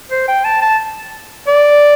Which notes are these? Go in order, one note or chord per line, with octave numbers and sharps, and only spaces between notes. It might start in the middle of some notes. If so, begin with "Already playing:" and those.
C5
G5
A5
A5
D5